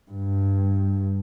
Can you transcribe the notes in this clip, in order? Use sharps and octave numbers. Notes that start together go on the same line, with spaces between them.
G2